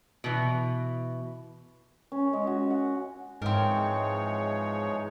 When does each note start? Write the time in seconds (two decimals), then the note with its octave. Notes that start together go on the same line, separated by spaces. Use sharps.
0.24 B2 E3
2.12 C#4
2.33 G#3
2.47 F#4
2.70 F#5
3.42 G#2 E3 F3 G#3 C4 D#4 A#4 C#5